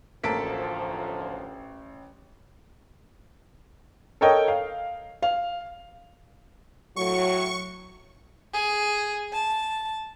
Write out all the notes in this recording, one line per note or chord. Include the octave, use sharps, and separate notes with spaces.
A1 D2 F3 A#3 A4 A5 B6 D7
A4 A#4 C#5 D#5 G5
F5
F5
A2 F#3 C#6
G#4
A5